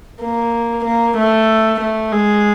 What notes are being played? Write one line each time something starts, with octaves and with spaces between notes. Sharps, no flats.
A#3
A#3
A3
A3
G#3